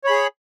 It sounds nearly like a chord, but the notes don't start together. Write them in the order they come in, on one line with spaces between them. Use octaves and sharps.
C#5 B5 G#4